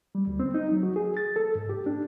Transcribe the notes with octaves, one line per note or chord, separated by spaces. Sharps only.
G3
D2
C4
D#4
F#3
F#4
G#4
A6
A4
G#2
G4
D4